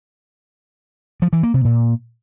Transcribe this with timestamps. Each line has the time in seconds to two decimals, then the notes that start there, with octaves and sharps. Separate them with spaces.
1.22 F3
1.33 E3
1.43 A#3
1.54 C3
1.65 A#2